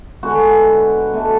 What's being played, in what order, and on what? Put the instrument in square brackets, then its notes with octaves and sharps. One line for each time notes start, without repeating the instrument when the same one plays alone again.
[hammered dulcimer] D3 G#3 B3 F#4
B2 A3 D4